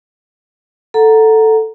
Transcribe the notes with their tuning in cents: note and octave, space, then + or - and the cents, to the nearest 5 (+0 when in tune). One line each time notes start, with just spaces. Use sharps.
A4 +0 F#5 -5 A#5 +0